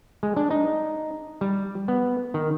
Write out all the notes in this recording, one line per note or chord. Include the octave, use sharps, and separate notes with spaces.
G#3
D4
D#4
G3
B3
D#3